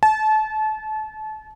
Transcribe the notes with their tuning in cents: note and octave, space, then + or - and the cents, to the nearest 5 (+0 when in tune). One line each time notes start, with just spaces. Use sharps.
A5 -30